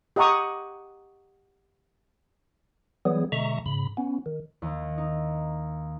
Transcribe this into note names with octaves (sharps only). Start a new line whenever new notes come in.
G4 D#5 F#5 A#5 C#6 D#6
E3 F#3 G3 B3 G#4
B2 D3 G#3 E5 A#5 C#6
G#2 C#3 B5
B3 C#4
D#3
D#2
D#4